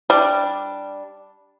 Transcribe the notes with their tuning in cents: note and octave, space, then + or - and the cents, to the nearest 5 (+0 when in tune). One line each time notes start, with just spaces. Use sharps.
G3 +0 D4 +0